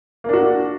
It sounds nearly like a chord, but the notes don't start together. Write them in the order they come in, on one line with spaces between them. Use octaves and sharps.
A#3 D4 F#4